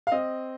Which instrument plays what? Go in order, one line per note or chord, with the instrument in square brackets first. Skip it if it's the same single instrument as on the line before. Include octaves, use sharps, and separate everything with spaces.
[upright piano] F5
C4 D#5